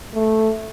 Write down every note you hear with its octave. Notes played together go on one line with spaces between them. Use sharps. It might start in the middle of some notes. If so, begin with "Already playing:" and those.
A3